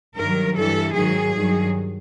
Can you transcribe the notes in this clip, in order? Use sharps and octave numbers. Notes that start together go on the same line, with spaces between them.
G2 D#3 F#3 A#4
G2 E3 A4
G#2 D#3 F#3 G#4
G2 D#3 F#3